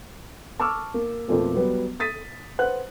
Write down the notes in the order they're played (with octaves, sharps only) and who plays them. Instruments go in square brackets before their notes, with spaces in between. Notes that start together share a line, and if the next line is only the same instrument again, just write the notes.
[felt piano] A5 C#6 D6 E6 F6
A#3
F2 B2 F3 A3 A#3
F#3 G3 B3
D#6 A6 B6 D#7
B4 C5 F#5 F#6